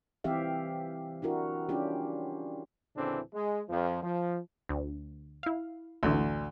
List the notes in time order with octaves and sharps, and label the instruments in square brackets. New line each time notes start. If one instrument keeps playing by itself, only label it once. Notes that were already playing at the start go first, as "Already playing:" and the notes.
[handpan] E3 C4 G4 E5 F5
D4 E4 F#4 A#4
C#4 D4 F4 G4
[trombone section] D2 A2 C#3 E3 C4 D4
G#3
F2 F3
F3
[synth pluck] D2
E4 F5
[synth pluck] A1 E3 [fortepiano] D2 D3